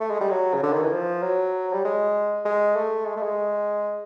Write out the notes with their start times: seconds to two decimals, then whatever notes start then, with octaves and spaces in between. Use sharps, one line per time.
0.01 A3
0.11 G#3
0.21 G3
0.31 F#3
0.54 C#3
0.63 D3
0.73 D#3
0.82 E3
0.92 F3
1.23 F#3
1.73 G3
1.85 G#3
2.45 G#3
2.76 A3
3.07 G#3
3.16 A3
3.23 G#3